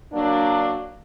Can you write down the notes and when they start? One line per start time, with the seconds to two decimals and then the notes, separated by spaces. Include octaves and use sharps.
0.13 F#3 A#3 D4